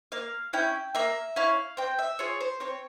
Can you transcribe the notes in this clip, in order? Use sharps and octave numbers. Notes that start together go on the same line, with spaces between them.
A#3 F5
C#4 E4 G5
A#3 E5
C#4 E4 F5
C4 G5
E5
F4 G#4 C#5
C5
C4 C#5